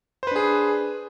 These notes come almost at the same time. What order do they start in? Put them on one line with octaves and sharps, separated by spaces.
C5 B4 D4 G#4